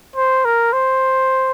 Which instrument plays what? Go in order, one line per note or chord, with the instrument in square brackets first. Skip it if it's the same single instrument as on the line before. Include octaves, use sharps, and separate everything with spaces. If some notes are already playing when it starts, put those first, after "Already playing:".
[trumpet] C5
A#4
C5